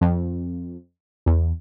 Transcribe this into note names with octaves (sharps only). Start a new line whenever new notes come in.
F2
E2